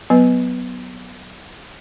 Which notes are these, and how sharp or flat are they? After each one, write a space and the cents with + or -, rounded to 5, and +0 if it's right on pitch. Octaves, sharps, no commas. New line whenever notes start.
F#3 +0 B3 +0 B4 +0